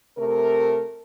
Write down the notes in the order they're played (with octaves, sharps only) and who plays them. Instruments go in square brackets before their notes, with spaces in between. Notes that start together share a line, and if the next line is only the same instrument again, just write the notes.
[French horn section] C3 A3 A#4